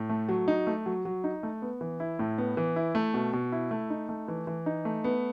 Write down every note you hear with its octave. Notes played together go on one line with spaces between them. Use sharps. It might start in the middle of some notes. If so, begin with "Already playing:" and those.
Already playing: A2
A3
F#3
D#4
A3
F#3
F#3
D#4
A3
B3
E3
E4
A2
B3
E3
E4
A3
B2
B2
E4
A3
D#4
A3
E3
E3
D#4
A3
B3